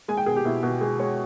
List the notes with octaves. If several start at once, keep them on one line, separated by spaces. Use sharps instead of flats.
G#3 G#5
G5
B2 G#4
G4
B2 E4
B2
G#3 G#4
G#3 C#5